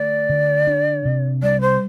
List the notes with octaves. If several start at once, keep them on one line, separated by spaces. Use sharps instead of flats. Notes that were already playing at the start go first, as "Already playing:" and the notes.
Already playing: D3 A3 D5
D3
D4
C3
G3 D5
C5